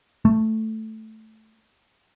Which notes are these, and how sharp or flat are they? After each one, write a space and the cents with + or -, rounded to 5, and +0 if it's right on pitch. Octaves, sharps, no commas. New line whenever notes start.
A3 +0